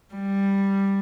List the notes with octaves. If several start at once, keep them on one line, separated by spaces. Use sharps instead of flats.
G3